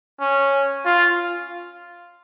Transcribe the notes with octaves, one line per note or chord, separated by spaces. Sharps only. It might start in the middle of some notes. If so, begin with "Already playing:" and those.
C#4
F4